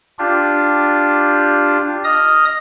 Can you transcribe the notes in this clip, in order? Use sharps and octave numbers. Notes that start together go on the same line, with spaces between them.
D4 F4 G4
D#5 D#6 F6